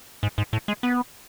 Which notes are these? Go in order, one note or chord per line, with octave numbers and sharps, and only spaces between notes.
G#2
G#2
A2
G#3
B3